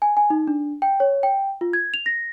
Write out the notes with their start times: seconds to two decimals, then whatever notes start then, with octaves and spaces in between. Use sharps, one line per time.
0.02 G#5
0.17 G#5
0.30 D#4
0.48 D4
0.82 G5
1.00 C#5
1.23 G5
1.61 F4
1.73 G#6
1.94 F7
2.06 A#6